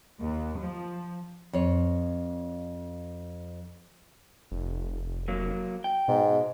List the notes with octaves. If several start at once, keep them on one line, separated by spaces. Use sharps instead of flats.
D#2
F3
F2 C#5
F1
F#3 A#3
G5
G#2 B2